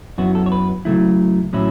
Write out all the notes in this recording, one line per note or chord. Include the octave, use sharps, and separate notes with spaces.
F#2 F#3 B3 E4 F#4
A4
C#5
B4
C#3 F#3 A3 E4
A2 F#3 C#4 E4